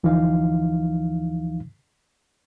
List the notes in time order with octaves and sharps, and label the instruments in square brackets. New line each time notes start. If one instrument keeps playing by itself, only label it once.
[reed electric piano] D2 E3 F3 D#4 F5